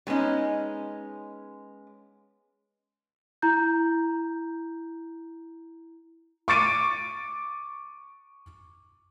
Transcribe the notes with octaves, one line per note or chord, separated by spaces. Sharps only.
F#3 G#3 B3 C#4 D#4
E4 A#5 G6
C#6 D6 A6 D7 D#7